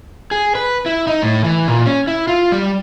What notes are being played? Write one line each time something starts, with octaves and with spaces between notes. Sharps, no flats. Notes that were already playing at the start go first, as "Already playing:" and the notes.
G#4
B4
E4
D#4
A2
E3
A#2
C#4
E4
F4
G3